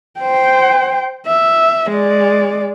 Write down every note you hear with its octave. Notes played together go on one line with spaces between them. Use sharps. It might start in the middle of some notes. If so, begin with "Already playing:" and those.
C5 G5
E5
G#3 D5